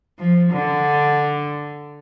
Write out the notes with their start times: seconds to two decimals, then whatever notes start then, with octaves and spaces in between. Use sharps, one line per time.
0.19 F3
0.53 D3